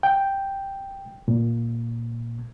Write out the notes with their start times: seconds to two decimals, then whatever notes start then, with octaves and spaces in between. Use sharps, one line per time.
0.03 G5
1.28 A#2